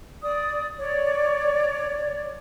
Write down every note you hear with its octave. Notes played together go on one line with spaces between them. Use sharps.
D5 D#6
C#5 D5